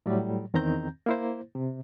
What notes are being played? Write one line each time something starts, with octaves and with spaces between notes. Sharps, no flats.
A2 F#3 G3
E2 D#3 C4 A#5 G6
A#3 E4 C5
C3